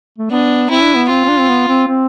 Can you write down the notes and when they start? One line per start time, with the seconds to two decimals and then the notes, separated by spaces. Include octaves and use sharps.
0.18 A3
0.31 B3 D4
0.70 C4 E4
0.83 D4
0.96 B3
1.09 C4 F4
1.25 C4
1.29 D4
1.40 C4
1.49 B3
1.68 C4
1.88 C4